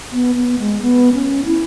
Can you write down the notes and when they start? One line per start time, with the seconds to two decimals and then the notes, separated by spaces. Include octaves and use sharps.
0.12 B3
0.36 B3
0.60 G#3
0.82 B3
1.13 C#4
1.45 E4